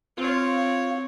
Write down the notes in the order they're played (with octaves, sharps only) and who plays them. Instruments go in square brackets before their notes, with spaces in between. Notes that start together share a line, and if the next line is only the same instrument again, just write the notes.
[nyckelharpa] C4 C#5 [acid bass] F4